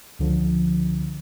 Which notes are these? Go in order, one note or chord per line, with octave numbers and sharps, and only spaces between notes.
C#2 D3 F3